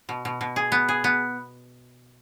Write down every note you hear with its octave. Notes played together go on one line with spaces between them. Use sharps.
B2
B2
B2
G#4
B3
G#4
B3